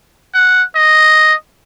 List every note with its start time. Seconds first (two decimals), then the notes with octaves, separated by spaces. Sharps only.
0.34 F#5
0.75 D#5